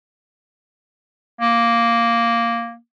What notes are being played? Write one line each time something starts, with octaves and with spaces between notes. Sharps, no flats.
A#3